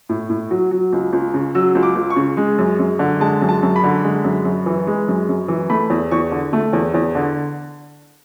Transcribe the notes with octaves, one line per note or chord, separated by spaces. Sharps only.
A2
A2
F#3
F#3
C#2
C#2
C#3
F#3 E6
C#2
D6
C#2
C#6
C#3
G#3
F#2
F#2
D3
G#3 A5
F#2
A5
F#2
B5
D3
G#3
F#2
F#2
E3
G#3
F#2
F#2
E3
A3 B5
E2
E2 C#6
D3
A3
E2
E2
D3